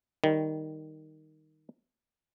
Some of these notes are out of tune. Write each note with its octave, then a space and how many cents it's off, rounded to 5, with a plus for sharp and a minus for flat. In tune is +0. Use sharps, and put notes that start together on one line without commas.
D#3 +0 G3 +0